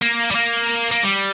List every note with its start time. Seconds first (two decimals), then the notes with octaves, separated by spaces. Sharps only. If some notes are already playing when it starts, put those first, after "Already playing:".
0.02 A#3
0.31 G3
0.35 A#3
0.92 A#3
1.04 G3